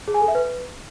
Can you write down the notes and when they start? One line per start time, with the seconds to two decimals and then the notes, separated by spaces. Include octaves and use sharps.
0.08 G#4
0.14 G#5
0.21 A4
0.28 E5
0.35 B4